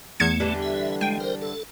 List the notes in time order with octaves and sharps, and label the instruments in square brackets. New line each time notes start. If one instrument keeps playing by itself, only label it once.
[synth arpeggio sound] E2 G#6 C#7 [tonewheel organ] A3
[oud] D3 E3 G3
[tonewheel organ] E5
[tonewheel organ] G#3 [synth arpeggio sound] G5
[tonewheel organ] A#4 C5
A4